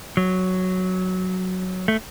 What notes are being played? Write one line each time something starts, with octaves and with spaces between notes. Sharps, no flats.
F#3
A3